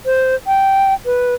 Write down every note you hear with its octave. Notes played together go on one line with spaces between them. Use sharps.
C5
G5
B4